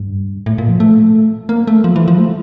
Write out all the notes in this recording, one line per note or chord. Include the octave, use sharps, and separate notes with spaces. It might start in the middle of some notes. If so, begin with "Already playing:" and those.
Already playing: G2
A2
A#2
F3
A3
A#3
A3
F3
E3
F3
A3